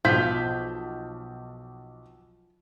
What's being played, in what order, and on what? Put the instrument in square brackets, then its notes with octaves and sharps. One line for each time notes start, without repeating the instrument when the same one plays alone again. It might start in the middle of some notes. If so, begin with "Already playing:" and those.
[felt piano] B1 G6 B6 [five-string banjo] F3